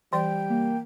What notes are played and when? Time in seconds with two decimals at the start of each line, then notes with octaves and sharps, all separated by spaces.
0.13 E3 G3 D5 G5
0.49 A#3